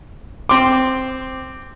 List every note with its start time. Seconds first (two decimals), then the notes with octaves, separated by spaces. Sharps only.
0.49 C4 C6 D6